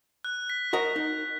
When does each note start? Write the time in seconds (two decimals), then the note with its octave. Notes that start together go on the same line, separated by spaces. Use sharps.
0.24 F#6
0.50 B6
0.73 F#4 A#4 D#5
0.96 D#4